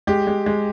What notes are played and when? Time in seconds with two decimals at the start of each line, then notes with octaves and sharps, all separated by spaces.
0.07 G#3 G4
0.27 G#3
0.46 G#3